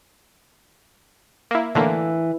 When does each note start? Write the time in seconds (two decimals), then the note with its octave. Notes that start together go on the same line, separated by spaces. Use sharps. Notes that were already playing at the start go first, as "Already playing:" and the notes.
1.51 A#3 E4
1.75 A2 D3 E3 A#3